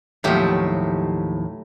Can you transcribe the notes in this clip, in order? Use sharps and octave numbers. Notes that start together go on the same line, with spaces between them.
D#2 A2 F3 F#3 A3 G4